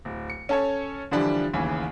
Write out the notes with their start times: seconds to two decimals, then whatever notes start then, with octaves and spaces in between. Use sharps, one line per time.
0.05 D1
0.30 C#7
0.49 C#4 A4 C#5
1.11 D3 E3 F3 G3 D4
1.53 A1 D#2 C#3 E3